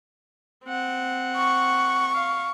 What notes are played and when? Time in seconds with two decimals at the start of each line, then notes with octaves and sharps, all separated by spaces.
0.65 C4 F#5
1.37 C#6
2.14 F5